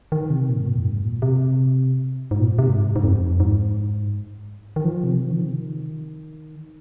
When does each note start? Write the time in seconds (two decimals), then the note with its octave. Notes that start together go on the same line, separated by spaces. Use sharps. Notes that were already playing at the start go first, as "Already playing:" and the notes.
0.12 D#3
0.30 C3
0.49 A#2
0.57 G#2
0.67 A#2
0.76 F2
0.85 G#2
1.03 A#2
1.22 C3
2.31 G#2
2.39 A#2
2.59 C3
2.67 G#2
2.96 G#2
3.04 F2
3.40 G#2
4.76 D#3
4.85 F3
5.04 C3
5.21 F3
5.31 D#3
5.42 C3
5.52 D#3